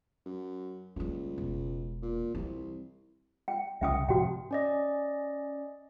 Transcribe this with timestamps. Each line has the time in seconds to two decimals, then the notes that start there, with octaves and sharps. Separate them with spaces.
0.26 F#2
0.96 C#2 G3 A#3
1.38 E1
2.02 A#2
2.35 C2 E3
3.48 G5
3.81 C2 C#3 C#4 E5 G5 D#6
4.09 G#2 C3 F3 F#4 G5
4.51 C#4 D5 D#5